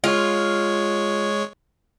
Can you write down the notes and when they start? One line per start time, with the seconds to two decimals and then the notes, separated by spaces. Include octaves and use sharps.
0.04 G#3 F4 C#5